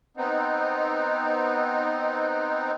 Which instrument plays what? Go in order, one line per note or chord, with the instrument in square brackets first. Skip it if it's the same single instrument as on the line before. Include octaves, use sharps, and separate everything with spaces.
[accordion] B3 C4 D#4